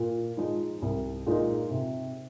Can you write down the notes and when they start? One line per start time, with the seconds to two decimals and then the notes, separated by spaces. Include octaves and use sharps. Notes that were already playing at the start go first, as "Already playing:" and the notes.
Already playing: A#2
0.37 F3 G#3 D#4
0.82 C2
1.26 A#2 G#3 D#4
1.70 C3